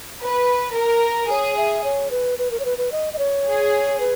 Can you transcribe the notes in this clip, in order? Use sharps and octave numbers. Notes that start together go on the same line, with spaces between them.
B4
A#4
G#4 C#5
E5
C#5
B4
B4
A#4
C#5
B4
B4
D#5
D#5
C#5
G#4
B4